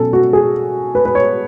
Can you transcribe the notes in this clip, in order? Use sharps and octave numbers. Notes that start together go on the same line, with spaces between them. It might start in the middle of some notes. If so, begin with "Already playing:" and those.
Already playing: B2 F#3 C#4 A4
F#4
G#4
B4
B4
C#5